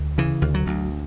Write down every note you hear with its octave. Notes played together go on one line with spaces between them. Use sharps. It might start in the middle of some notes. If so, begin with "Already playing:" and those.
Already playing: D2
C#3 E3
D2
F#3
D2